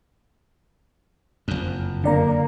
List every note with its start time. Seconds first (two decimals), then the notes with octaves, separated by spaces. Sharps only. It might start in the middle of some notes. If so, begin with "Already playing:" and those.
1.48 F#1 F2
2.04 D3 A#3 D5 A#5